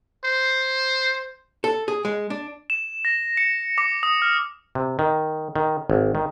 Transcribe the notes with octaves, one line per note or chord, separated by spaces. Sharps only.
C5
A4
G#4
G#3
D4
E7
A#6
C#7
D6
D#6
F6
C3
D#3
D#3
G#1
D#3